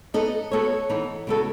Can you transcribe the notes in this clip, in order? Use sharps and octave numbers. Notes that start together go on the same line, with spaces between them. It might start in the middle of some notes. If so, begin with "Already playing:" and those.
B3 D#4 A4 D#5
B3 F#4 A4 C#5
E3 B3 D#4
C#3 G#3 B3 F#4 A4